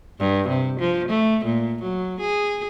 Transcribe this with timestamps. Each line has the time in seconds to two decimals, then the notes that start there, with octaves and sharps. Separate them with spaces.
0.19 G2
0.49 C3
0.80 F3
1.08 A3
1.45 A#2
1.82 F#3
2.21 G#4